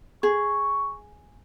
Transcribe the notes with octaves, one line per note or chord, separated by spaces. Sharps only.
G#4 C#6